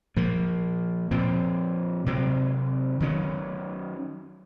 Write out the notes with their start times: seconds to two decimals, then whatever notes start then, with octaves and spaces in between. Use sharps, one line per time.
0.16 A#2 F3 A#3
1.11 A#2 F3 C4
2.06 C3 F#3 C4
3.00 D#3 F#3 A#3 C#4